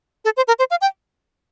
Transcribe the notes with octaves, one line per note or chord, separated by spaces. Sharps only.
A4
C5
A#4
C5
F5
G5